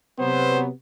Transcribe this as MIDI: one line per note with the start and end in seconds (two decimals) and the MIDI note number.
0.19 0.68 48
0.19 0.68 54
0.19 0.68 59
0.19 0.61 72